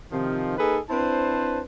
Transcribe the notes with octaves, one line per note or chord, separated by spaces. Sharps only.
C3 D#3 F3
A#3 D#4 G#4 A4 B4
C4 D4 E4 B4 C5 A5